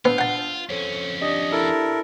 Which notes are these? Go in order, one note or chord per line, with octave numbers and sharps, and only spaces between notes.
B3 D4 F4 E6 G6
F#5 A5
F2 C#4 A4 C5 C#5
D4 G4 D5 D#5
E4 A4 A#4